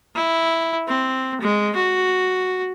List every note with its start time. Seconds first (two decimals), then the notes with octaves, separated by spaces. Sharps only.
0.15 E4
0.88 C4
1.41 G#3
1.76 F#4